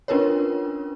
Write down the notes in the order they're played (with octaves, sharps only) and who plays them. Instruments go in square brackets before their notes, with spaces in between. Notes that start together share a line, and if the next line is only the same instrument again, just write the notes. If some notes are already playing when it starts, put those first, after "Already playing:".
[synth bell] C#4 D4 F4 A#4 B4 C#5